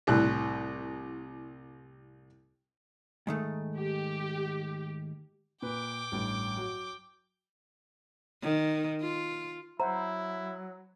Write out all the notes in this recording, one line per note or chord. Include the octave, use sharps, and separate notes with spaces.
C2 A2 F#6
G#2 D#3 A3
G4
A#2 B4 G5 D6
A1 G2
F#3 F#4
D#3
F4
F#3 E4 C5 E5 F#5 A#5